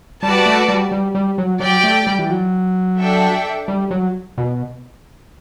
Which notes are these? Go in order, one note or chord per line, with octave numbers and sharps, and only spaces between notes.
G3 F#4 B4 D5 A5
A3
G3
G3
G3
F#3
F#3 G4 D5 G5
A3
G3
E3
F#3
D4 A4 E5 G5
G3
F#3
B2